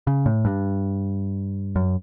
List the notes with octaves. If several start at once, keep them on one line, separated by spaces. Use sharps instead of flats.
C#3
A2
G2
F#2